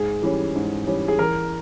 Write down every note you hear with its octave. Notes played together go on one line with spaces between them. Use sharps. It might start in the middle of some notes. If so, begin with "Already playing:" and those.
Already playing: G#2 G#4
E3 G3 C#4
G#2
E3 G3 C#4
G#4
E2 A#4